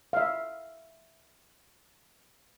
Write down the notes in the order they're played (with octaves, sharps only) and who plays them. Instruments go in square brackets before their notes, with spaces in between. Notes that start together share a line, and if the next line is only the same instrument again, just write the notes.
[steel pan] E5 F5